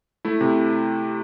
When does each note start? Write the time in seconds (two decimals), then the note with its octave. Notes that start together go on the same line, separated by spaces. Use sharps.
0.25 A3 E4
0.41 C3